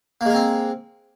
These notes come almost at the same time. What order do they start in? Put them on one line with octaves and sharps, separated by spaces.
A#3 G#3 A#4 C4